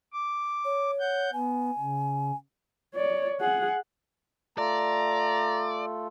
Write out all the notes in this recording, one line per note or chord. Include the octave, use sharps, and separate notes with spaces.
D6
C#5
F#5 G6
B3 G#5
C#3
C#5 D5
G#4 F#5
A3 F4 A4 D5 A#5